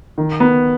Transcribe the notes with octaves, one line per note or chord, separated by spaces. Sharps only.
D#3
B3